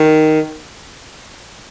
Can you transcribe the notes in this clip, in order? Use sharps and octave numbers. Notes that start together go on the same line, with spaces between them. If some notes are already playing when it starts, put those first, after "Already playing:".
Already playing: D#3